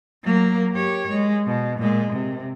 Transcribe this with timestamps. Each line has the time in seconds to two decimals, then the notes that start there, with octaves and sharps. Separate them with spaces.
0.23 F#3 A#3
0.73 G4 C#5
1.10 G#3
1.47 B2
1.79 A#2 G#3
2.12 C3